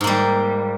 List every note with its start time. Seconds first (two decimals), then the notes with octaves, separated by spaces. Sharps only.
0.01 G#2
0.04 A#3
0.07 G3